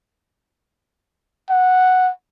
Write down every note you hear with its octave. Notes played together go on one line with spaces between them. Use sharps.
F#5